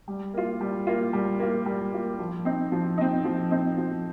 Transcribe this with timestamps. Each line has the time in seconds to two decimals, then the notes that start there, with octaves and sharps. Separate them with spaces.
0.08 G3
0.34 A#3 F4
0.61 G3
0.87 A#3 F4
1.13 G3
1.39 A#3 F4
1.66 G3
1.92 A#3 F4
2.19 F3
2.45 C4 D#4
2.72 F3
2.98 C4 D#4
3.25 F3
3.51 C4 D#4
3.78 F3